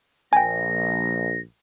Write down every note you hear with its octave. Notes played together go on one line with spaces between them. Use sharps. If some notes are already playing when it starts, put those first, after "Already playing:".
A#1 G5 G#5 A#6